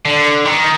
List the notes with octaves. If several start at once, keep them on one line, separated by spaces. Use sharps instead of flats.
D3
D#3